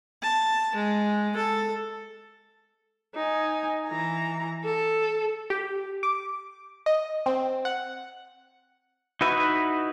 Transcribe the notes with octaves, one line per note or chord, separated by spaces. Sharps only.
A5
G#3
A4
D#4 G#5
E3 A#5
A4
G4
D6
D#5
C4
F#5
D#4 E4 F#4 B4 E5